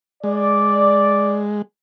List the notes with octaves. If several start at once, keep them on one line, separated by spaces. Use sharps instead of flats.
G#3 D5